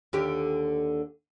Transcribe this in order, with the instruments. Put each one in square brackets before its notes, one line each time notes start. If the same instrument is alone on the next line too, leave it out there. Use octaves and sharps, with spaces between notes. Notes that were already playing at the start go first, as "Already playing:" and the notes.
[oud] D#2 D3 G4